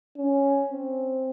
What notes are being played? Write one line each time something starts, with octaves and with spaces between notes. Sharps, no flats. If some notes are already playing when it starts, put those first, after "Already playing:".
C#4
C4